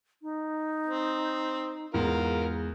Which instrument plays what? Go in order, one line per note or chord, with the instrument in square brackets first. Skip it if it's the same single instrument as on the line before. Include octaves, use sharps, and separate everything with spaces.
[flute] D#4
[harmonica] C4
[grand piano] E2 G#2 [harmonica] F4 A#4